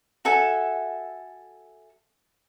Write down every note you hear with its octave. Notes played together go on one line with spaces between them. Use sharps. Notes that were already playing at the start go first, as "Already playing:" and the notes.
F#4 A4 E5 G#5